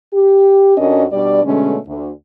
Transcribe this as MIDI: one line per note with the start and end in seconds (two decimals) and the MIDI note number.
0.14 0.76 67
0.78 1.05 41
0.78 1.05 61
0.78 1.05 62
0.78 1.05 66
0.78 1.05 70
0.78 1.05 75
1.13 1.42 47
1.13 1.42 55
1.13 1.42 62
1.13 1.42 74
1.45 1.77 47
1.45 1.77 50
1.45 1.77 56
1.45 1.77 57
1.45 1.77 61
1.87 2.10 38